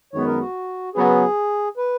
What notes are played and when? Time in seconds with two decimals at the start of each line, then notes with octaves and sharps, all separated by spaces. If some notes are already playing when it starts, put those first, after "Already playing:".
0.13 F#2 D#3 G#3 B3 C#5
0.27 A#4
0.40 F#4
0.95 C#3 F#3 B3 G#4
1.77 B4